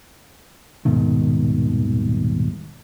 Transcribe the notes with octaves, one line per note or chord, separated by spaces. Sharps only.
D#1 G#2 B2 D#3